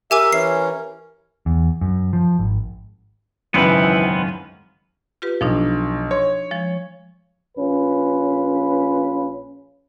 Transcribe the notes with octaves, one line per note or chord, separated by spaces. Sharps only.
G4 A#4 E5 G#5 D6
E3 C#4 C7
E2
F#2
F3
G#1
G#1 C#2 F#2 E3 B3 C4 B4
F4 G4 B4
B1 F3 D4 D#4
C#5 C6
F3 G#3
A#1 C#4 F4 B4